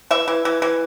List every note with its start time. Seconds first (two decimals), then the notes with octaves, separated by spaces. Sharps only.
0.11 E3 E5
0.28 E3
0.45 E3
0.62 E3